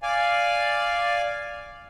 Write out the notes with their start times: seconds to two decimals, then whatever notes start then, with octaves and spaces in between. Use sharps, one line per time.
0.03 D5 F5 G#5